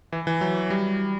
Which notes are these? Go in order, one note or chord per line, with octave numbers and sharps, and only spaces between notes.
E3
E3
F#3
G3